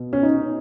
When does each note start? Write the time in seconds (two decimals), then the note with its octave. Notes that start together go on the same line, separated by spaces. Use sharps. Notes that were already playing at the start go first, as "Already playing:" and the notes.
Already playing: B2
0.13 C#4
0.23 D#4